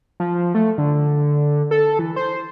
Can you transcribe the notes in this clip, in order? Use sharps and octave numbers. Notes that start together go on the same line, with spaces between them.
F3
A3
D3
A4
E3
C5